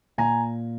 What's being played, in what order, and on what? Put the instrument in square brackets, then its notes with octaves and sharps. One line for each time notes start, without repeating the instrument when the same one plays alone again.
[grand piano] A#2 G#5 A#5